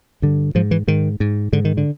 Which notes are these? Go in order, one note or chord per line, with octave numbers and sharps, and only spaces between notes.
G2 D3
G#2 F3
E3
G#2 D#3
G#2
G#2 D3
D#3
D3